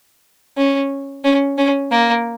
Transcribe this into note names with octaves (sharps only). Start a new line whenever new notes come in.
C#4
C#4
C#4
A#3